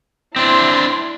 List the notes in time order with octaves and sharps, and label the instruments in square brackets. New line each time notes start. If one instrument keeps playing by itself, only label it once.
[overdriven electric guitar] C4 D4 [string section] E4 C6